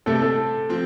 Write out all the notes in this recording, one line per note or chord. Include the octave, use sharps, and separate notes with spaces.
C3 A3 C4 A4
A4
F3 C4